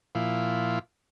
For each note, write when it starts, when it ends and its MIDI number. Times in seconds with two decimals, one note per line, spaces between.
0.15 0.79 46
0.15 0.79 53
0.15 0.79 64
0.15 0.79 77